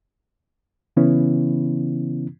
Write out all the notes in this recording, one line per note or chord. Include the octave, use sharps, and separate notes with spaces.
C#3 E3 B3 C#4 E4